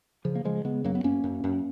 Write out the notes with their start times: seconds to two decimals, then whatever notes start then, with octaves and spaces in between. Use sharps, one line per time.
0.25 C#3 F3
0.35 A#3
0.45 C#3 F3 G#3
0.65 C#3 G#3 B3
0.84 F#2 F#3 A#3
0.95 B3
1.04 F#2 A#3 C#4
1.24 F#2
1.44 F#2